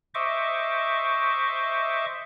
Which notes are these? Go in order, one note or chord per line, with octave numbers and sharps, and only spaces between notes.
C5 D#5 E5 C#6 D6